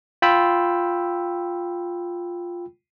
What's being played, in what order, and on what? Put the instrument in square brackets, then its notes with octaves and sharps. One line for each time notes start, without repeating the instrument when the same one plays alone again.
[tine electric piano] F4 G5 B5 E6